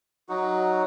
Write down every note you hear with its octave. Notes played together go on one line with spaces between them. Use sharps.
F#3 D#4 F#4